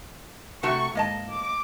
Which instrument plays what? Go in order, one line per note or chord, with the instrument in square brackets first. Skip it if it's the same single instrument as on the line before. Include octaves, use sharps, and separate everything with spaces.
[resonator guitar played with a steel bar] C3 A3 F#4 [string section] C#6
[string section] G#2 [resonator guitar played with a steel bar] A#3 D#5 A5
[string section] D6